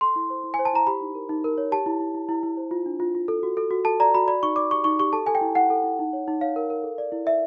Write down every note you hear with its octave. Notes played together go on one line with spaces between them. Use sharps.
A4 C6
E4
C5
E4
G#5
C5
A5
E4 A#5
G4 B5
D#4
A#4
D#4
A#4
C#5
G4 A5
E4
E4
E4
E4
E4
C5
F4
D4
F4
F4
A4
F#4
A4
F#4
A4 A5
D5 A#5
F#4 B5
D5 B5
D#4 C#6
D5 D6
G4 C#6
D#4 C#6
G4 C#6
A4 A5
A4 G#5
G5
E4
E4 F#5
A4
E4
D#4
C#5
D#4
C#5 F5
A#4
A#4
A4
D5
E4
D5 E5